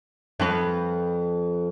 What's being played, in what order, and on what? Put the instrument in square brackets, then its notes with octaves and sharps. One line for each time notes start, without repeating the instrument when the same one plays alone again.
[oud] F2 B4